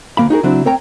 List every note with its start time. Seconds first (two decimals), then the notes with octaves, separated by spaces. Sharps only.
0.17 D2 A3 A#3 F5 B5
0.30 D#4 F#4 G#4 A#4
0.43 C#3 F#3 C4 D4 E4
0.65 C4 A#4 C#5 G5 A#5